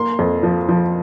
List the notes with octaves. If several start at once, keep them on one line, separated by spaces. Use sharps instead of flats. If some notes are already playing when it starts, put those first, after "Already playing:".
Already playing: A#3 C6
F2
F3
F3